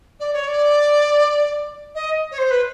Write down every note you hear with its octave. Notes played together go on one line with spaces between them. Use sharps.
D5
C#5
D5
D#5
C#5
C5
B4